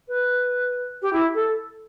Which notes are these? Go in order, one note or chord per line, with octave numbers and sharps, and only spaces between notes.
B4
G4
E4
A4